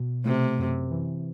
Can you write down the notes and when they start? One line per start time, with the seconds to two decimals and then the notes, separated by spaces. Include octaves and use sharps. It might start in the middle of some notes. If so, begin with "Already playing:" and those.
Already playing: B2
0.25 C3 A3
0.58 F#2
0.91 E3